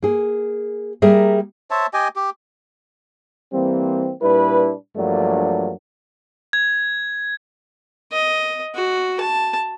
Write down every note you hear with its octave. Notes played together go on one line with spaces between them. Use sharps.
A#3 G#4
G3 A#3 G#4 A#4 E5
C5 C#5 E5 A5
G4 D#5 G5 G#5
G4
E3 G3 A#3 C4
A#2 G3 D4 E4 B4
G2 F3 F#3 A3 A#3 D4
G#6
D#5
F#4
A5